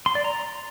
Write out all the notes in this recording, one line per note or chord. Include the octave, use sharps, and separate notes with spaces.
C6
D5
A#5